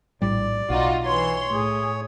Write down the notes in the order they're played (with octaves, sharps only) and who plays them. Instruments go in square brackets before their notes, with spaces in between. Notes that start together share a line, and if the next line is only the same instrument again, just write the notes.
[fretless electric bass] A#1 A2 G3 [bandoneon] D5
[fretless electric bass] B1 [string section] D#4 F4 [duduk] F#4
[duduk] E3 [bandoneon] C#5 [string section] C6
[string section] A2 [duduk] G#4